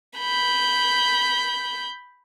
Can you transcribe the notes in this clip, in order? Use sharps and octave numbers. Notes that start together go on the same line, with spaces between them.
B5 G6